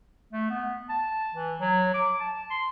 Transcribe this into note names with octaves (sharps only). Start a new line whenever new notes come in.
A3
B3
A5
E3
F#3
D6
A5
C6